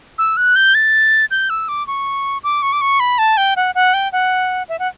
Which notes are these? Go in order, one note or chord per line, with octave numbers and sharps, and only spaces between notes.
E6
F#6
G6
A6
G6
E6
D6
C#6
D6
C#6
D6
C#6
B5
A5
G5
F#5
F#5
G5
F#5
E5
F#5